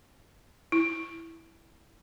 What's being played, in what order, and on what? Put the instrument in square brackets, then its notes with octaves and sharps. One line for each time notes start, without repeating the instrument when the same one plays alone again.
[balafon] E4